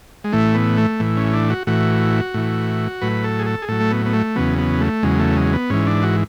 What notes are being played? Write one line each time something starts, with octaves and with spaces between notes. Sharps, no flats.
G#3
A2 E3 A3
B3
A3
A2 E3
C#4
D4
F#4
A2 E3 F#4
A2 E3
A2 F#3 B4
A4
G#4
A4
G#4
A2 F#3 A4
A3
B3
B3
A3
E2 C#3 F#3 B3
B3
A3
E2 C#3 F#3 G#3
A3
G#3
B3
G#2 E3 C#4
D4
F#4